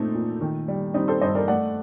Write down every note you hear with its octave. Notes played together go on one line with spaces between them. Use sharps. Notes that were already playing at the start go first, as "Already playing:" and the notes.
Already playing: A#2 A3 C4 D#4 A4
A#2
D#3
G3
G3 C4 D#4
A4 C5
G2 C5 D#5
A#4 D5
A3 D5 F#5